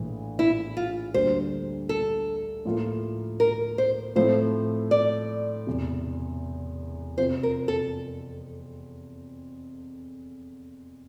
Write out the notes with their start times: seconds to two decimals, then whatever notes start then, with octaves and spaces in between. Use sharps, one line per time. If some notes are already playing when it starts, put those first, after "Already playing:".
Already playing: A#1 A2 E3
0.39 E4
0.77 F4
1.14 D2 D3 G3 A#3 D4 C5
1.89 A4
2.65 A2 F3 A#3 F4
3.40 A#4
3.78 C5
4.16 A2 F3 A3 C4 C5
4.91 D5
5.67 E1 E2 C3
7.18 F2 C3 F3 C5
7.43 A#4
7.68 A4